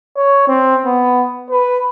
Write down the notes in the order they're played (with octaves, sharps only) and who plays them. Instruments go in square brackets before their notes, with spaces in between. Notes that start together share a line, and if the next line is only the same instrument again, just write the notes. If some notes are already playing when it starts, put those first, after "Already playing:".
[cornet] C#5
C4
B3
B4